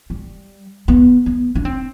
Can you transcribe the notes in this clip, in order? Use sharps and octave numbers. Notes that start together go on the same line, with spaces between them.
G3
B3
B3
D4
C4